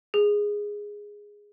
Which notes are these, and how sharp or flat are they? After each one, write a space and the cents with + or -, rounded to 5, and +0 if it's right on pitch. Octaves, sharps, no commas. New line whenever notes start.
G#4 -5